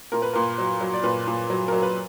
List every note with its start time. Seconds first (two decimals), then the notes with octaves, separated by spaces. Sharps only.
0.12 A#2 A#4
0.22 B4
0.33 A#2 A#4
0.58 F#3
0.81 F#3
0.94 D5
1.03 A#2 B4
1.27 A#2
1.50 F#3
1.68 F#3 A#4
1.82 B4